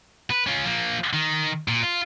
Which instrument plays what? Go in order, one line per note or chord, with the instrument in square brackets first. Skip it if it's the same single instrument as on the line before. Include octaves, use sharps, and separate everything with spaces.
[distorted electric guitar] B4
C#4 F4
F3 A#3
D#3
A#2
F4